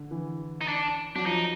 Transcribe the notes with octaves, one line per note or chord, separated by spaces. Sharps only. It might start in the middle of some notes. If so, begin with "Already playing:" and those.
Already playing: D3
E3
D#4
D4
F#3 D4
F3 D#4